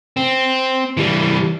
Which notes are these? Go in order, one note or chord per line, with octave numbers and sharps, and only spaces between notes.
C4
E3 G3